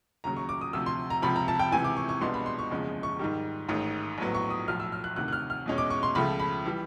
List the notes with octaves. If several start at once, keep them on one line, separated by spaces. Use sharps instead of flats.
D#2 C#3 F#3 A#5
C#6
D6
D#6
D2 C3 F3 E6
C6
A#5
C#2 C3 F3 B5
A#5
A5
G5
C#2 C3 E3 G#5
D6
C#6
C#6
C2 B2 G#3 B3 D4 C6
B5
C6
C#6
F#1 E2 C#3 F3 G#3
C#6
G#2 D#3 G3
A1 G#2 D#3
A#1 A2 F#3 B3
C#6
D#6
B1 A2 F3 F6
E6
F6
F#6
D2 C3 D#3 F#6
F#6
F6
F6
E2 B2 G#3 C#4
D6
C#6
C6
C#2 C#3 F3 A3 B5
B5
E3 G3